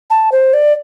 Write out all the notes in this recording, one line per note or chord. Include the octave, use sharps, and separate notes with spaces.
A5
C5
D5